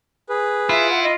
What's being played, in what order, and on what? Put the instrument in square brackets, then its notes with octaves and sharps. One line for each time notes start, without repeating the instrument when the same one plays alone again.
[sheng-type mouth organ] G#4 B4
[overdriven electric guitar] E4 [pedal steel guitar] F4 [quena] E5
[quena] F#5
D#5